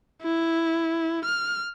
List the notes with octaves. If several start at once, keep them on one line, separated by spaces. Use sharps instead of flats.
E4
F6